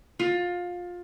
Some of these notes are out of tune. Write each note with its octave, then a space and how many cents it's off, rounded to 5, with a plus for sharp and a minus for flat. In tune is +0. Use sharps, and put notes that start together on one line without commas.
F4 +20